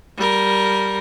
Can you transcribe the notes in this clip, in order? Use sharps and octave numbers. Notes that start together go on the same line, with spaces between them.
G3 A#4